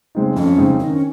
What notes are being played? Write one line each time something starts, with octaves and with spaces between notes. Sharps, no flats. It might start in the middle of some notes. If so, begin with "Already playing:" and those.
C#3 G#3 C4 D#4
F2 C#4
C#3 G#3 C4 D#4
D#3 D#4
C#4